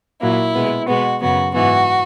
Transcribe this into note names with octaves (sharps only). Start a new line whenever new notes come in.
A#2 F#3 A#3 E4
B2 G#3 B3
B2 G#3 B3 F#4
F#2 C#3 F#3 B3 F#4
G#2 E3 B3 F#4